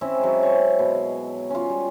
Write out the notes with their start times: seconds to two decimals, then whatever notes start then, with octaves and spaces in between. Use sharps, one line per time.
0.01 C4 C#4 E4 E5
0.19 F#3 G#3
0.43 C5 C#5
0.79 B2
1.50 C#4 F4
1.70 G3